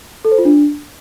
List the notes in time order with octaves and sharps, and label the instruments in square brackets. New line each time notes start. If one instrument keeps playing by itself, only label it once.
[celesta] A4
C5
F4
D4